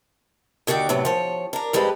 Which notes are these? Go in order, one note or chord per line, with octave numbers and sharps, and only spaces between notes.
D#2 D3 F#4 D5 G5
A2 C3 F#3 B3
F3 C#5
D4 A#4
F2 G3 G#3 A4 B4